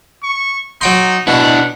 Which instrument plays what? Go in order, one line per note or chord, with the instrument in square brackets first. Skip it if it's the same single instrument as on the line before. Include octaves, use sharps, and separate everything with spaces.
[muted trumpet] C#6
[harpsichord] F#3 G5 C6 [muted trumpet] D#4
[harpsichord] B2 [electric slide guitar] D4 E4 [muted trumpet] F#5